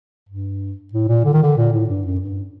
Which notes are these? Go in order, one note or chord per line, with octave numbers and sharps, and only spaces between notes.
G2
A2
A#2
D3
D#3
D3
A#2
A2
G2
F#2
G2